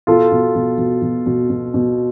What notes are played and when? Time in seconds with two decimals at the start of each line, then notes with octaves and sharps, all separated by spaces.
0.07 B2 F4 A4
0.32 B2
0.55 B2
0.78 B2
1.02 B2
1.27 B2
1.50 B2
1.74 B2